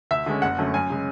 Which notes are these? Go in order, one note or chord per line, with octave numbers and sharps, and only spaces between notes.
D2 E5
D3 G#3 C#4
F#1 F#5
F#2 D3 A3 C#4
F#2 G#5
C#3 G#3